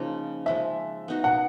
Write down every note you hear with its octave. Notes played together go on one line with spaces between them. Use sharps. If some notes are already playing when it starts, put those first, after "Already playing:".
Already playing: C#3 F3 A#3 D#4
F3 G#3 C#4 E5
B3 D#4 F#4
F#5